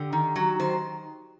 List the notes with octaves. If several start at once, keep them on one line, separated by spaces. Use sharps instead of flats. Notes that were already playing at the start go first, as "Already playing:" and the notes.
Already playing: D3 G4
D#3
F#3
D#3 C5